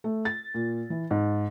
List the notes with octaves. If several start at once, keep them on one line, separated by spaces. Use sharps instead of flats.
A3
A6
A#2
E3
G#2